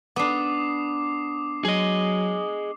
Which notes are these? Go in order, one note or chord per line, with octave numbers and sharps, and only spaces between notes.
B3 D4 D6 D#6 C7
F#3 G#4 D#5